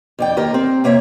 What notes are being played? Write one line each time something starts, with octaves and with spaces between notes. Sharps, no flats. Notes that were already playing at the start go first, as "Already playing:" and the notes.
F2 D5 G5
D#2 G4 A#4
C4
C3 A#3 C#5 E5